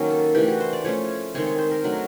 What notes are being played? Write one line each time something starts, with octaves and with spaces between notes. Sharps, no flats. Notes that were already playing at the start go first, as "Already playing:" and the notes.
Already playing: D#3 F#3 A#3 C#4 F#4
A4
E3 A3 D4 G4
F#4
C5
D5
F3 A3 C#4 C#5
D#3 G#3 C4 C#5
C#5
C5
A#4
F#3 A3 D4